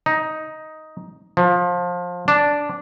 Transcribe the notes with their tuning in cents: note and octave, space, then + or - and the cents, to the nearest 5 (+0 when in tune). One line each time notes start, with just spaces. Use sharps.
D#4 +5
F3 +20
D4 -5